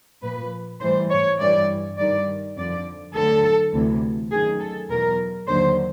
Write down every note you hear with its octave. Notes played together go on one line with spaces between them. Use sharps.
A#2 F3 B4
A2 E3 G3 C5
C#5
G2 E3 G3 D5
G2 D#3 G3 D5
F2 D3 F3 D5
D2 D3 F#3 A4
D2 C3 E3
F#2 D#3 F#3 G#4
A4
E2 B2 F#3 A#4
D#2 D3 F#3 C5